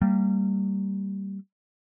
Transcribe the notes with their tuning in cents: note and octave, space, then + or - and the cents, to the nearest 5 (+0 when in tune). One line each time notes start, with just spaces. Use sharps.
G3 -10 A#3 -30